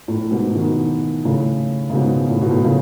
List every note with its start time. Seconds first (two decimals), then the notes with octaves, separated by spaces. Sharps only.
0.08 A2
0.31 G#2 B2
0.55 B2 D#3
1.25 A2 C#3
1.90 C#3
1.95 G#2 B2
2.30 A2
2.41 B2
2.51 A2
2.64 A2 C#3